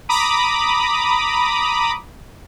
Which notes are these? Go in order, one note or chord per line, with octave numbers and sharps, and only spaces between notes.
A#5 B5 D6 D#6